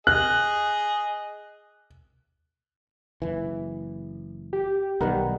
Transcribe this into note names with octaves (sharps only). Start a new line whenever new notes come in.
G#4 D#5 F#6
F#1 E3
G4
B1 D#3 G3 B3 A#4 F#5